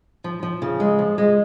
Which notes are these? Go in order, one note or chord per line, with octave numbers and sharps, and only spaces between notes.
F3
F3
C#3
G#3
F3
G#3